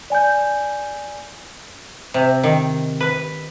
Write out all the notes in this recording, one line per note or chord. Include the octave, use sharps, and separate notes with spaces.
D5 G#5 A5 G6
C3
D#3
B4